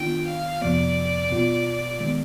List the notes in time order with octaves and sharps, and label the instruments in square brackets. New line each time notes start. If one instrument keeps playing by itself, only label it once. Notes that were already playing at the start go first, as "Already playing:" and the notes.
Already playing: [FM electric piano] D#3 B3 D4 F4 [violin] G5
[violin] F5
[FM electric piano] F2 C3 F3 B3 [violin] D5
[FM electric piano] B2 B3 F4
D#3 G#3 B3